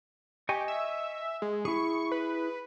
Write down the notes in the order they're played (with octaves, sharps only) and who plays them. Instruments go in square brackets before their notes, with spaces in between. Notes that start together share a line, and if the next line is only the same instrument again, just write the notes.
[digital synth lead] G4 [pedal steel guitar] D#5 G#5 C#6
[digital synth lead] E5
G#3
[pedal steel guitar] E4 G#4 [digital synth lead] C#6
[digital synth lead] B4